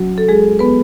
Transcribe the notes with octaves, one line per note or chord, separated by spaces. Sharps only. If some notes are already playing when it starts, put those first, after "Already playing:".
Already playing: F#3 C#4 F#4
A4
G#3 G#4
B3 B4